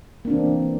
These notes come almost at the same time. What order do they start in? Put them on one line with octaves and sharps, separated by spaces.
A#3 D4 C4 E3